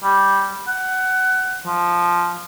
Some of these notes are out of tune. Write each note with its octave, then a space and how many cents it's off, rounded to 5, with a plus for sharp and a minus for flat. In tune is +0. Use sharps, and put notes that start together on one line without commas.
G3 +0
F#5 +20
F3 -5